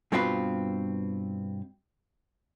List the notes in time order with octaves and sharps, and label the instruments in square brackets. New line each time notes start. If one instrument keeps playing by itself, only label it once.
[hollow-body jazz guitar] G2 B2 C4 F4 B4